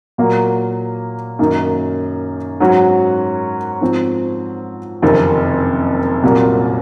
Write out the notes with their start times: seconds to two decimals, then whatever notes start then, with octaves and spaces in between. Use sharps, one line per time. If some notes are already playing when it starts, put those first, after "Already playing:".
0.18 A#2 F#3 A#3
1.39 F#2 D#3 A#3 D#4
2.60 G#2 F#3 C#4 F#4
3.81 G#2 F3 C4
5.02 F#1 F2 C3 D#3
6.23 C2 A#2 F#3 A#3